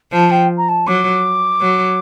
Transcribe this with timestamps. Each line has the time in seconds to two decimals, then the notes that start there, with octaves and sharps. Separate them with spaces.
0.12 F3 A5
0.31 G5
0.57 A#5
0.68 A5
0.87 F#3 D6
1.61 F#3